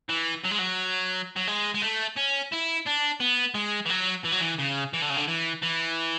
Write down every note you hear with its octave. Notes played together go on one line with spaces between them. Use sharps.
E3
F#3
G#3
F#3
F#3
G#3
G#3
A3
C#4
E4
D4
B3
G#3
E3
F#3
E3
F#3
E3
C#3
E3
D3
C#3
D3
E3
E3